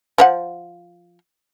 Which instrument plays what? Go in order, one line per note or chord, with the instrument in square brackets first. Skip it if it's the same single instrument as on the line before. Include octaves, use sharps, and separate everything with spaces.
[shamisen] F3 C5 F#5